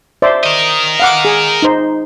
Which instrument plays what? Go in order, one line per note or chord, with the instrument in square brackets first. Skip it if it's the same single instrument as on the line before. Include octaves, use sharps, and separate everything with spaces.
[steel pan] C5 D5 E5
[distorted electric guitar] A#4 D#5
[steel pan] F5 F#5 D6
G#4
D#4 C5